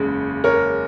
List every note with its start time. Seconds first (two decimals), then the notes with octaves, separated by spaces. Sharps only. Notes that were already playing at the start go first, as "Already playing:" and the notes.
Already playing: F#1 E2 C#3 G#3 C#4
0.44 A#4 C#5